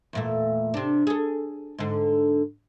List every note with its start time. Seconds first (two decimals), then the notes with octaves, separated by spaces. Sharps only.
0.13 E2 A#2 A3
0.74 C3 D4
1.07 G#4 A4
1.78 G#2 D3